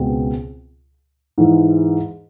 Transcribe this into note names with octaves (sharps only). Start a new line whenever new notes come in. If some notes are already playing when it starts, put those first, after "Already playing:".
Already playing: C#2 B2 G#3 C4
G#2 E3 G#3